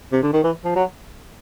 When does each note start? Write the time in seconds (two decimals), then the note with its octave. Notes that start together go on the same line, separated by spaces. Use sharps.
0.12 C3
0.23 D3
0.33 D#3
0.43 E3
0.64 F3
0.76 F#3